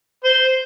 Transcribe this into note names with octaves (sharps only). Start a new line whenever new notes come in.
C5